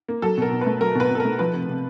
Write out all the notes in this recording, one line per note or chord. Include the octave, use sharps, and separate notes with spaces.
A#3
F#3 A4
B2 A#4
B2
A3 B4
F#3 A#4
B2 B4
B2 A4
A#4
A3
F3 B4
C3
C3